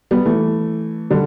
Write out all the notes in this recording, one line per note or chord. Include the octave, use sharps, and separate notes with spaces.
G3 B3
E3 A3
D3 G3